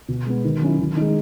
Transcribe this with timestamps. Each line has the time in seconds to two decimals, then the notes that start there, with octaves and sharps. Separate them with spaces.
0.08 B2
0.26 G#3 B3
0.44 D#3
0.61 F#3 C#4 E4
0.79 D#3
0.97 G#3 D#4